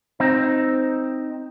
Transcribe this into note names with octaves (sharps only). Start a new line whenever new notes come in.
C4 D#4